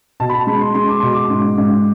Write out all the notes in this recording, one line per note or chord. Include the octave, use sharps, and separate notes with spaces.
B2 A5
B5
A5
G#3 B5
C6
G#3 C6
D6
B2 C6
D6
G#2 C6
G#2